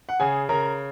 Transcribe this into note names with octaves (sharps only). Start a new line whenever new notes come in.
F#5
C#3 G#4 G#5
C#3 A#4 A#5